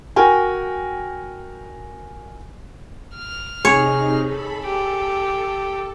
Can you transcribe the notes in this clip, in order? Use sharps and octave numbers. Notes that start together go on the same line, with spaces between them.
F#4 A#4 G5 G#5
F6
C3 D#4 G#4 C#5
A4 B5
G4 A4